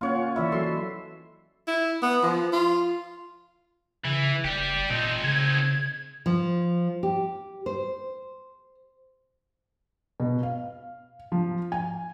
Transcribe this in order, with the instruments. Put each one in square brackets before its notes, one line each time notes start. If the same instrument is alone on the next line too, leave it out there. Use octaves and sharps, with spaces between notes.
[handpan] A#3 C#4 [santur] F4 C#5 F#5
[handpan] E3 D5 E5 [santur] E4
[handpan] F#3 F#4 A4 [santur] C6
[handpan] D#5
[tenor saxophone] E4
B3
F3
F4
[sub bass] C#3 [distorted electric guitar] E3
[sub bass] F#1 [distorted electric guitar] G4 D5
[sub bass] A#2 [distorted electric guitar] C4 D#4
[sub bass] C#3 [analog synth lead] G#6
[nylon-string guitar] F3
G4
C5
[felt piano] B2
F5
F3
G#5